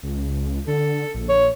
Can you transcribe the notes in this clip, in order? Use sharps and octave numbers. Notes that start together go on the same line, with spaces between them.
C#2
D3 A4
A#1
C#5